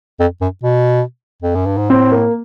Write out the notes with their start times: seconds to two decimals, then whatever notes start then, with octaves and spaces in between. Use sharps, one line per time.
0.20 F2
0.41 F#2
0.63 B2
1.42 F2
1.55 F#2
1.66 G2
1.77 G#2
1.90 A2 C4
2.11 A#3